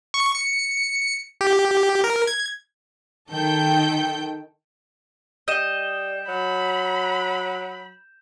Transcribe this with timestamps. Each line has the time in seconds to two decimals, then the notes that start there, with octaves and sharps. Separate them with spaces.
0.14 C#6
0.35 C#7
1.41 G4
2.04 A#4
2.27 G#6
3.30 D#3 A4 G5 G6
5.48 G3 D#5 G6 E7
6.28 F#3 B5